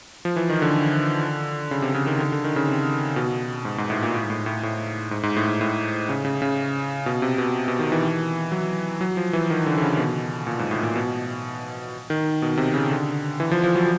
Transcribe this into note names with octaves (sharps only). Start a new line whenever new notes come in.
F3
E3
D#3
D3
C#3
C3
C#3
D#3
D3
D3
D#3
C#3
C3
B2
G#2
G#2
A2
A#2
A2
G#2
A2
A2
A2
G#2
G#2
A2
G#2
A2
C#3
C#3
C#3
B2
C3
B2
B2
D#3
E3
F#3
F#3
F3
E3
D#3
D3
D3
C#3
B2
A#2
G#2
A2
A#2
B2
D#3
B2
C3
C#3
D3
E3
F3
F3
F#3